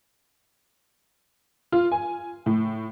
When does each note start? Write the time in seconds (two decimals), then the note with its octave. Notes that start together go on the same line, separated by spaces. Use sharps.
1.72 F4
1.92 G#5
2.46 A2